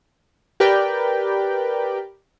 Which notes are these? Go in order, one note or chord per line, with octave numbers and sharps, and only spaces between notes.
G4 A#4 B4 D5 G5 B5